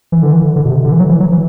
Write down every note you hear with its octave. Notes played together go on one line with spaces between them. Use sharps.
E3
D3
E3
D3
B2
C3
D3
E3
F#3
E3
F#3
E3